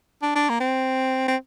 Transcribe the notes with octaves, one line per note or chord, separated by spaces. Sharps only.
D4
D4
A#3
C4
C4